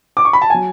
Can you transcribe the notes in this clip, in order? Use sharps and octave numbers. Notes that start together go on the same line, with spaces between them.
D6
C#6
B5
A5
F#3 G#5